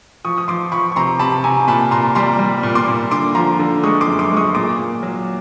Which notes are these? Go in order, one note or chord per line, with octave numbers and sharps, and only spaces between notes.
F3 C#6 D#6
D#6
F3 C6 D6
F3 B5 C#6
C#6
C3 A#5 C6
C3 A5 B5
C3 G#5 A#5
A#2 A5 B5
A#2 A#5 C6
G3 A#5 C6
G3
A#2
C6 D6
A#2
D3 C6 D6
F3 A#5 C6
D3
G#3 C#6 D#6
C6 D6
F#2
C6 D6
G#3
C#6 D#6
A#2 C6 D6
A#2
F#3